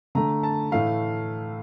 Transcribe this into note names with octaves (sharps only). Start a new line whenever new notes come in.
D3 A3 A#5
A5
A2 E3 A3 F5